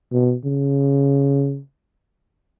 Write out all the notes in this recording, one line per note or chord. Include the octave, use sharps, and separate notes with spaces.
B2
C#3